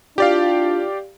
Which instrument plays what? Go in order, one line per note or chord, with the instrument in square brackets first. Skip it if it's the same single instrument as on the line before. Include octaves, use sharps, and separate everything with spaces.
[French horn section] D4 E4 F4 [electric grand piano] G4 D5 F5